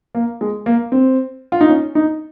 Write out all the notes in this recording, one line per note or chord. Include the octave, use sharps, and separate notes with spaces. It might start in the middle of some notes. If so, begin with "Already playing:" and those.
A#3
G#3
A#3
C4
F4
D#4
C#4
D#4